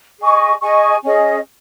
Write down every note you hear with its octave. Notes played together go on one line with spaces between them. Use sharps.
G#4 D#5 G#5 C#6
G#4 D#5 G#5 C#6
C#4 G#4 D#5